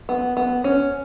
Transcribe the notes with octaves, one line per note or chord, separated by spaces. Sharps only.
B3
B3
C#4